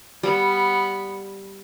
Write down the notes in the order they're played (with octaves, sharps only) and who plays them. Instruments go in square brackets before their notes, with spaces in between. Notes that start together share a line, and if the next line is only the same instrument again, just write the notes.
[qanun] G3 [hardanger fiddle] B3